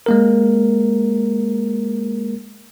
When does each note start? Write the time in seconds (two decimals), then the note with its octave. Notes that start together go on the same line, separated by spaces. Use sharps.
0.06 G#3 A#3 A#4